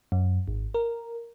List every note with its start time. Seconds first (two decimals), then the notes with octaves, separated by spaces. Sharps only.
0.12 F#2
0.48 G#1
0.74 A#4